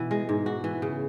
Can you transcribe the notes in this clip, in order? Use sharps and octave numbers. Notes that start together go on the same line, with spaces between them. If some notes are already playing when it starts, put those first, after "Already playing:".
Already playing: B2 E3 B3
G#3
G#2
F#4
E3
C#3